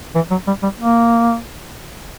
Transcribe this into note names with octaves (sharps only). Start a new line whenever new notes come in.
E3
F#3
G3
G3
A#3